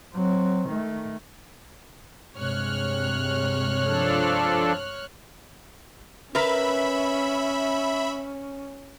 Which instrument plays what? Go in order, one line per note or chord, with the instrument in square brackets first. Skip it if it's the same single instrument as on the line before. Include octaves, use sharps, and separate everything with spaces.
[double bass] F#3 C4
D#3 A3
[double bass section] G2 C3 G#3 [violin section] C#5 F6 F#6
[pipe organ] F3 D4 A4
[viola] C#4 [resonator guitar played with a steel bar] A#4 B4 [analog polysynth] E5 B5